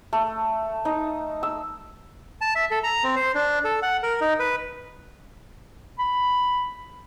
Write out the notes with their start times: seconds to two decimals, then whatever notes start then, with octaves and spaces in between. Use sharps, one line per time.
0.13 A3
0.85 D#4
1.43 E6
2.41 A5
2.55 E5
2.71 A4
2.83 A#5
3.04 C4
3.16 C5
3.35 D4
3.65 A4
3.82 F#5
4.03 A#4
4.21 D#4
4.40 B4
5.99 B5